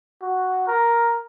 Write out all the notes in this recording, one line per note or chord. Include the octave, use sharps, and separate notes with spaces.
F#4
A#4